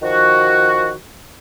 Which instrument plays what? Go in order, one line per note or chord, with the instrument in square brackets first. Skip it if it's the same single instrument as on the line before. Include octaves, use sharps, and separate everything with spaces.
[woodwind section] D#3 F3 F#4